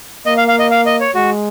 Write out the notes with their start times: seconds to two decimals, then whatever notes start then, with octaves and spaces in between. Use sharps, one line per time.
0.26 A#3 D#5
0.37 F5
0.48 F5
0.59 D#5
0.71 F5
0.86 D#5
1.00 C#5
1.15 G#3 F#4